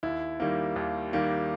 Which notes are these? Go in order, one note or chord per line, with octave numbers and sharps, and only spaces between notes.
D#2 E4
D#3 G3 A#3
D#2
D#3 G3 A#3